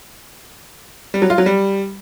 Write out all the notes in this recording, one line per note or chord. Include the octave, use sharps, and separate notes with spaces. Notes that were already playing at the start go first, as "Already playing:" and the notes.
G3
F#3
F4
F#3
G3